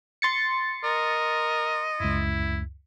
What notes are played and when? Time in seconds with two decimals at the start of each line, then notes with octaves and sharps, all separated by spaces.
0.22 C6 A6 C#7
0.84 A#4 D#5
2.00 C#2 F#2 E4